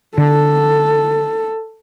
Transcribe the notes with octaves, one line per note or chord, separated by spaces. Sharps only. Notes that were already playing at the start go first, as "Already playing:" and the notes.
D3 A4